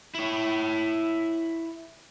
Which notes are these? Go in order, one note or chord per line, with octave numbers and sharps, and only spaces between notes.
E4 C#5